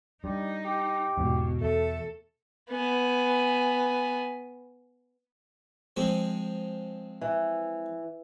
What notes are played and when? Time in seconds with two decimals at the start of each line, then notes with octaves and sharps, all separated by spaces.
0.24 G2 G3 D#4
0.65 G4
1.18 E2 G#2 B2 E3
1.61 E2 A3 A4
2.71 B3 G#5
5.96 F3 G#3 C4
7.21 E3